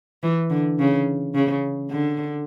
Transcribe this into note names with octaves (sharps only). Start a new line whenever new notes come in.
E3
D3
C#3
C#3
D3